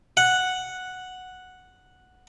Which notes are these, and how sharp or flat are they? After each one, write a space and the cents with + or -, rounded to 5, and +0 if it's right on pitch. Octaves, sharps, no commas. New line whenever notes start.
F#5 -5